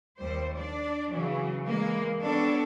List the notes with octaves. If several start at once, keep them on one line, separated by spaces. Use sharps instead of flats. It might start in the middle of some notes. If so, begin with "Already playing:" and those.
D#2 G3 C5
D4 D5
C#3 E3 F#3
E3 G#3 A#3
G3 B3 D4 A4 C#5